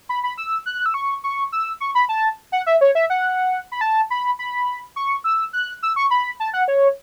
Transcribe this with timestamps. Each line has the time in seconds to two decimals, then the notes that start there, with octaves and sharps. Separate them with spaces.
0.09 B5
0.23 B5
0.38 E6
0.66 F#6
0.86 E6
0.94 C#6
1.24 C#6
1.52 E6
1.80 C#6
1.95 B5
2.09 A5
2.52 F#5
2.66 E5
2.81 C#5
2.95 E5
3.10 F#5
3.72 B5
3.81 A5
4.10 B5
4.39 B5
4.96 C#6
5.24 E6
5.53 F#6
5.83 E6
5.96 C#6
6.11 B5
6.40 A5
6.53 F#5
6.68 C#5